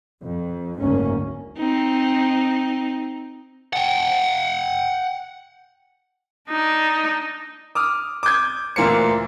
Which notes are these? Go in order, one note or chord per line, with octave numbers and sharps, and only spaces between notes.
F2
F#1 D2 G#2 A#3 C#4
C4 D#4
F#5 G5
D4 D#4
D6 D#6 F6
D6 D#6 G6 G#6
D2 A#2 E3 A#3 C5 C#7